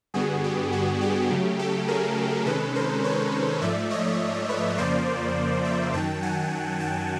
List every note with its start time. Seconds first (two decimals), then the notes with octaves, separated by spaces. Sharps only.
0.14 G2 D3 G3 B3 F#4 G#4
0.44 G4
0.72 F#4
1.01 G4
1.30 C#3 F#3 A3
1.59 G4 A4
1.88 G#4 A#4
2.46 C3 D#3 G#3 C#4 A4 B4
2.75 A#4 C5
3.04 B4 C#5
3.61 G#2 F3 A3 D5 E5
3.90 C#5 D#5
4.49 B4 C#5
4.78 F2 C#3 F3 A#3 C5 D5
5.65 D5 E5
5.93 F#2 D#3 F#3 G5 A5
6.22 F#5 G#5
6.80 G5 A5